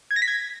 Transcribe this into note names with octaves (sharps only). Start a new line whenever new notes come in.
G#6
A#6
B6
G#6